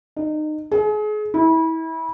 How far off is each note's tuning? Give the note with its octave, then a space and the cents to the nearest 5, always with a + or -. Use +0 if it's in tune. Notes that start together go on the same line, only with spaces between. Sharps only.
D#4 -25
G#4 +35
E4 -30